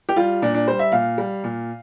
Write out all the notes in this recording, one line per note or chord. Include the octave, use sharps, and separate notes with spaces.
G4
G3 F4
A#2 D4
D4
G3 C5
E5
A#2 F5
G3
A#2